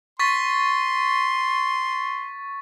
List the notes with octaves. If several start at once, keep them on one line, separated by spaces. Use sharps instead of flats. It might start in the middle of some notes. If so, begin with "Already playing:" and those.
C6 C#6 A6 B6